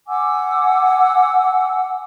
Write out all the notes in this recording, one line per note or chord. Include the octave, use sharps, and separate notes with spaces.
F#5 G#5 D6 E6